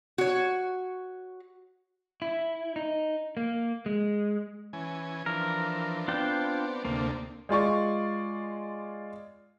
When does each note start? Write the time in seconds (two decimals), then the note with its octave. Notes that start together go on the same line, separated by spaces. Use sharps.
0.18 F#4 C#5
2.22 E4
2.76 D#4
3.37 A#3
3.86 G#3
4.73 E3 C#4 G#5
5.26 E3 F3 D4 A#4
6.08 B3 C4 D4 F4 D5 G5
6.85 D2 C3 A#3 D4
7.49 G#3 F4 D5 C#6